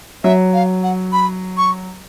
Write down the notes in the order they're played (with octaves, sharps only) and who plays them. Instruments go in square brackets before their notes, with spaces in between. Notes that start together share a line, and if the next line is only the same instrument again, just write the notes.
[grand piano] F#3 [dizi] E5
[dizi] F5
F#5
B5
C#6